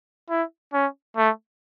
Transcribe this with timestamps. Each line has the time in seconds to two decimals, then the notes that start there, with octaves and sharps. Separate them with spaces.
0.30 E4
0.73 C#4
1.17 A3